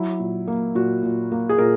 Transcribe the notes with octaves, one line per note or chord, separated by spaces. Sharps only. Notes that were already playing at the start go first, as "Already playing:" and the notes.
Already playing: F#3 E4
A#2
A#3
A#2 F#4
A#2
A#3
G#4
A#2 A#4